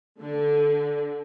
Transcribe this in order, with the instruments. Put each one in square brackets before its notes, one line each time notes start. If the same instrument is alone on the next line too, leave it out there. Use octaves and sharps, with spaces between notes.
[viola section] D3